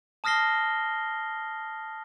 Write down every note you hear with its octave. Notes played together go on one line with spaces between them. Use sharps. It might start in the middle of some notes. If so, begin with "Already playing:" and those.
A5 D#6 F6 A#6 C7 G7